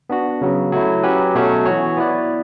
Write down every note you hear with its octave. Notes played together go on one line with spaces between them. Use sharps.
B3 D4 F#4
C#3 F#3 B3
F#3 A3 E4
F#3 C#4 G4 B4
B2 F#3 A3 C#4
E3 B3 F#4 C#5
B3 E4 B4 D5